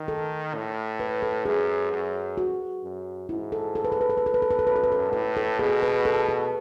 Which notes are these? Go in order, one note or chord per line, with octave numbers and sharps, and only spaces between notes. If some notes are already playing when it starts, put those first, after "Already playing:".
Already playing: D#3
A4
A2
B4
A4
F#2 G#4
F#2
F#4
F#2
G#2 E4
A4
A4
B4
A4
B4
A4
B4
A4
B4
A4
B4
A4
F#2 B4
A4
B4
A4
A2 A4
A4
B2 G#4
B4
A4
A4